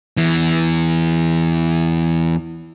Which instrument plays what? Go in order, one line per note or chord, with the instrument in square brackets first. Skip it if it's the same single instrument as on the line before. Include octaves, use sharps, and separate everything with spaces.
[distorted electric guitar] E2 E3